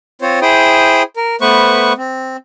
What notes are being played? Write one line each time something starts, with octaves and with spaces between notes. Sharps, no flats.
C4 F4 C5 C#5
E4 G#4 C5 G5 D#6
A#4
A3 B3 B4 C5 C#6
C4